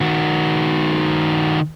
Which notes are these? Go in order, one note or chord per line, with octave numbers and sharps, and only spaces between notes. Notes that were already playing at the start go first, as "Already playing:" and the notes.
D#3 F#4